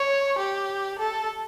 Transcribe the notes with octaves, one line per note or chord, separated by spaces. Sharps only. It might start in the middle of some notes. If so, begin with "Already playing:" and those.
Already playing: C#5
G4
A4